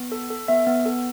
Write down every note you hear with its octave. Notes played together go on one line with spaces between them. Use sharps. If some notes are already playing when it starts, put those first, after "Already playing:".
Already playing: B3
A4
A4
B3 E5
B3
A4